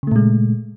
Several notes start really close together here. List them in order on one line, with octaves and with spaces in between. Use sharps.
C#3 A3 A#2 G#3